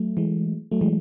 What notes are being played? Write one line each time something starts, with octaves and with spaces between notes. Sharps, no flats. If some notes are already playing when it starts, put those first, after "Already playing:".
Already playing: F#3 A3
E3 G#3
F#3 A3
E3 G#3